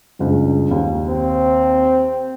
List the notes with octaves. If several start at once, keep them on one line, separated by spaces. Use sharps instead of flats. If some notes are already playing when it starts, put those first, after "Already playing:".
F#1 C#2 G2
D#2
C4